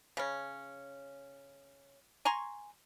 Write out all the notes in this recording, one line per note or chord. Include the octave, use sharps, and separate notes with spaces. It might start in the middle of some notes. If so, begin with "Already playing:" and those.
C#3 C#4
G#5 A#5 C6 C#6